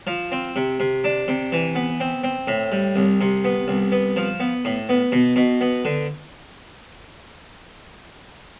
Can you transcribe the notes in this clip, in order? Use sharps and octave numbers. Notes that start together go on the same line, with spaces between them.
F3
C4
C3
C3
D4
C3
E3
B3
C4
C4
A2
G3
C2
C3
B3
C2
B3
F3
B3
A2
B3
B2
B2
B3
D3